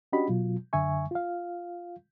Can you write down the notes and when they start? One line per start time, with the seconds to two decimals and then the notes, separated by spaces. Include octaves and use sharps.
0.13 C#4 D4 F#4 G4 D#5 B5
0.29 B2 F#3 F4
0.73 F#2 D3 E5 G#5 C#6
1.11 F4 F5